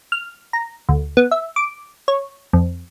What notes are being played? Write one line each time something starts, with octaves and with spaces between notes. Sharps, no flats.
F6
A#5
D2
B3
E5
D6
C#5
F2